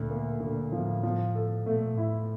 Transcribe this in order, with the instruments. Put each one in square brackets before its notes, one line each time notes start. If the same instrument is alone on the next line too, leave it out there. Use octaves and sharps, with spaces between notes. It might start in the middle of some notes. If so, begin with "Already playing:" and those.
Already playing: [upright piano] D2 [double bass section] A#2
[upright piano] A#3
[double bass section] A#2 [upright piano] D3
[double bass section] A2 [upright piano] F3
[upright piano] F3
A4
[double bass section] A#2 [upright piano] A3
[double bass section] A2 [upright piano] E4